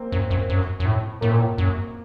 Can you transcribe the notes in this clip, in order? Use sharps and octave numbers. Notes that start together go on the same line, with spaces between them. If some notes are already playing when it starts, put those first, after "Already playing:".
Already playing: A#3 C4
F#2
F#2
F#2
F#2
A2
A2 A#3
A#2
A2
F#2